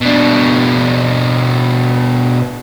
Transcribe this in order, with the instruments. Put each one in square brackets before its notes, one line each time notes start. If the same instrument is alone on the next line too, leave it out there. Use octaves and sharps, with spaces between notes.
[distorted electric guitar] B2 D4